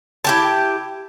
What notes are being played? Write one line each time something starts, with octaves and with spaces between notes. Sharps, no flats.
E4 G4 A5